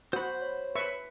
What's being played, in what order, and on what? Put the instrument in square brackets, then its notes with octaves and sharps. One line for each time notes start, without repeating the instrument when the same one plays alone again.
[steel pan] F#4 [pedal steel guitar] C5 B5
[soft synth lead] C#5
[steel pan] B4 E5 C#6